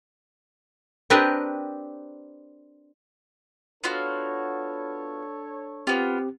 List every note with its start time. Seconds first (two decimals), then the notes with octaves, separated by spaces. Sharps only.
1.10 C4 D4 G4 A#4 B4 D#5
3.84 B3 D4 F4 F#4 A4 C#5
5.87 B3 C4 F4 G4